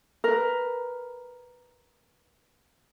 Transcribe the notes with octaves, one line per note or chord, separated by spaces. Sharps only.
A#4 B4